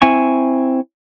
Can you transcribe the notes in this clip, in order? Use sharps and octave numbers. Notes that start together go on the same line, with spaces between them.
C4 E4 G#5 C#6